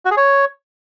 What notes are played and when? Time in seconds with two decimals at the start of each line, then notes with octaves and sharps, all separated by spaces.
0.05 F#4
0.11 G#4
0.17 C#5